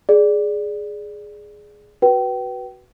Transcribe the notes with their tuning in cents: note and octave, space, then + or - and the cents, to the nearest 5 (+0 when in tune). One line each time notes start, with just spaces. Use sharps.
G#4 +5 D5 +0
F#4 +10 B4 -10 G5 -30